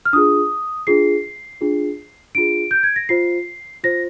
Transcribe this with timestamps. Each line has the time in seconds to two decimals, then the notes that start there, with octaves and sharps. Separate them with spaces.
0.05 F6
0.13 D4 F4 G#4 D#6
0.87 D4 F4 G#4 C7
1.61 D4 F4 G#4
2.35 D4 F4 G#4 D7
2.71 G6
2.83 G#6
2.96 A#6
3.09 F4 C5 C7
3.83 F4 C5 A#6